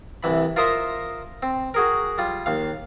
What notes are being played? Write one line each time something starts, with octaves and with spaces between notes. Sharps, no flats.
C2 E3 B5
F4 A#4 C5 D#5 E5 A#5
C4
F#4 G#4 A#4
G3 F4
D#2 F5